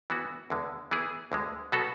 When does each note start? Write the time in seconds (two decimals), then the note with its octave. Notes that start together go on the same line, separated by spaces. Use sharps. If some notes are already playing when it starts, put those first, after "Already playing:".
0.10 E3 B3 F#4
0.50 E2 D3 G#3
0.91 E3 B3 E4 G#4
1.32 D2 D3 G#3
1.72 B2 F#3 B3 F#4 A4